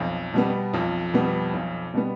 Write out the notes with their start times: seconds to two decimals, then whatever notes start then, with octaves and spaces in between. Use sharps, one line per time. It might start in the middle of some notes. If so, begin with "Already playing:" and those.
Already playing: B1 F2 F3
0.34 B2 G3 B3
0.73 B1 F2 F3
1.14 B2 G3 B3
1.54 B1
1.94 B2 G3 B3